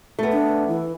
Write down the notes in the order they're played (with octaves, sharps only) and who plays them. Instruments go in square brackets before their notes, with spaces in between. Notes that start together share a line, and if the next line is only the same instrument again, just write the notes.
[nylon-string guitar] A3 B3
[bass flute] D4
E3